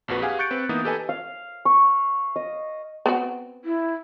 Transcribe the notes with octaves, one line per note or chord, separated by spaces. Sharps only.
A#1 F2 F#4 B4
G4 G#4 F5 F#5 G#5
C#6 F#6 G6 A6 C#7 D7
C4 B4
E3 A#3 B3 D#4 D#6
G4 A4 B4 D#5 G#5 A5
F5
C#6
D#5
B3 C4 F#4
E4